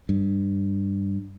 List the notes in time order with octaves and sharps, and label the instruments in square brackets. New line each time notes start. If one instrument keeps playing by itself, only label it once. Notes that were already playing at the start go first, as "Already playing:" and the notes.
[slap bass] G2